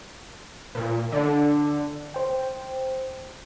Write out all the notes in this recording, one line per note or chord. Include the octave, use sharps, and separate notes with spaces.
A#2
D3
C5 G5